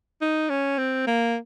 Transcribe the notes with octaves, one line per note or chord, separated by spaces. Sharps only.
D#4
C#4
C4
A#3